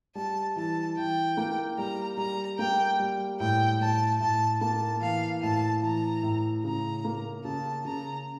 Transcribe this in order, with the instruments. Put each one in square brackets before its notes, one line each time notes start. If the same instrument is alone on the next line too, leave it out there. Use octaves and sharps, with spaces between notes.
[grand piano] G3 [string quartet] A5
[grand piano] E3 [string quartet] A5
[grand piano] E3 [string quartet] G5
[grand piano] A#3
[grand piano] G3 [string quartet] A#5
[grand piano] G3 [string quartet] A#5
[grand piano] A#3 [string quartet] G5
[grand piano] G3
[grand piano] A2 [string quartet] G5
[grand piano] A2 [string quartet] A5
[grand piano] A2 [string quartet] A5
[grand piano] A#3 [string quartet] A5
[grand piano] E3 [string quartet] F5
[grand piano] A2 [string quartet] A5
[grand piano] E3 [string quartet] A#5
[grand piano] A2
[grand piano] C#3 [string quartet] A#5
[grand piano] A#3
[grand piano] C#3 [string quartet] A5
[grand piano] C#3 [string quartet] A#5